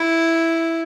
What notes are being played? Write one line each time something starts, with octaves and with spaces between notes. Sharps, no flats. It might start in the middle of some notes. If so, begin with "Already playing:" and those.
Already playing: E4